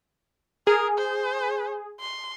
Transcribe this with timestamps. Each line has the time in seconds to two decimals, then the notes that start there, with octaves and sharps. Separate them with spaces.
0.67 G#4 A#4
0.98 C5
2.00 C6